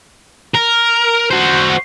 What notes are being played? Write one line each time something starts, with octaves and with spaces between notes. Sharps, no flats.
A#4
F#4 C5